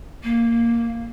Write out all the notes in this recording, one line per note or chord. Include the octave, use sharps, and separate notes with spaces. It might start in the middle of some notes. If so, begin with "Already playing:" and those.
A#3